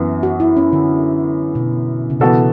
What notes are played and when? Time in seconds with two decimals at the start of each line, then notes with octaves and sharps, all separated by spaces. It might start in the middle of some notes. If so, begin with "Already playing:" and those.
Already playing: F#2 E3 B3
0.23 F#4
0.40 E4
0.57 C#4
0.73 D3
1.55 B2
2.10 C#3
2.20 B2 E3 B3 F#4 A4